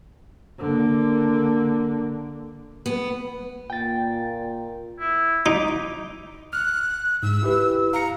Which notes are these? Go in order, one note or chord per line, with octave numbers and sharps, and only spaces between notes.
D3 A#3
B3
A#2 G5 A6
E4
D#4 D6
F6 F#6
G#2 E6
E4 G4 B4
F5 A#5 C#7